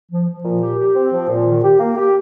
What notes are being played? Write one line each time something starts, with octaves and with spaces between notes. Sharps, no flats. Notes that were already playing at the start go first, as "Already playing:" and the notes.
F3
F3
A#2
G4
G4
C4
F3
A#2
D#3
G4
A#3
G4